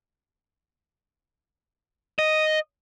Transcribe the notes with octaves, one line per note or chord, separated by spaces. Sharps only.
D#5